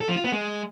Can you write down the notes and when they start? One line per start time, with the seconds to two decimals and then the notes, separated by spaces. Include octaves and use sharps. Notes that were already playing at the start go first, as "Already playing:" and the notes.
0.01 A4
0.09 F3
0.17 F4
0.24 B3
0.32 G#3